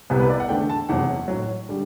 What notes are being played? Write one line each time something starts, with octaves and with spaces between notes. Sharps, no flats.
C2 C3 G3 B3
B4
D5
F#5
E2 D3 A3 G5
A5
F#1 E2 C3 F#3 F#5
A1 A2 F#3
D3 G3